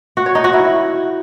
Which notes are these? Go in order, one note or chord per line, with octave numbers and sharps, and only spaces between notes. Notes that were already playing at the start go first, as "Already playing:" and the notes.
F#4
C#5
D#4
F#4
E4